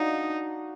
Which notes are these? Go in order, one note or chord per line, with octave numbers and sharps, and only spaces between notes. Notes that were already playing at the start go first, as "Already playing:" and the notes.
Already playing: D4 D#4 F#4 D5 F5